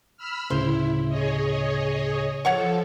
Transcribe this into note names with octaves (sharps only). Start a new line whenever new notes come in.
B5 E6 F6
D2 A2 C#3 E4 C5
G#4 C#5 D#5
F3 A4 C#5 F#5 C#6